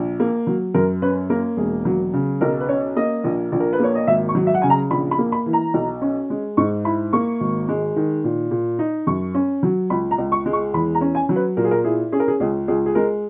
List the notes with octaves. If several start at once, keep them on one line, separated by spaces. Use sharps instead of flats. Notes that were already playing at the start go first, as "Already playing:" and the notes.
Already playing: A#1
A#3
F#3
F#2 A#4
C#4 B4
A#3 A#4
E1 G#4
F#3
C#3
B1 A#4
B4
C#4 C#5
A#3 D#5
A#1
A#1
A#4
B4
A#3 C#5
D#5
G#1 E5
C#6
F#3
E5
F#5
C#3 G#5
A#5
A#1 B5
B5
A#3
B5
E3
A#5
B1
C#4
G#3
G#2 C#6
E4 B5
A#3 C#6
G#1
G#3
D#3
A#2
A#2
D#4
F#2 C#6
C#4
F#3
C#2 B5
A#5
C#2
C#6
G#3
C#6
E2 B5
A#5
C#4
G#5
F#3
B4
A#2 A#4
G#4
A#4
E4 G#4
C#4 G#4
A#4
G#4
C#2 G#4
C#2 G#4
G#4
G#3 A#4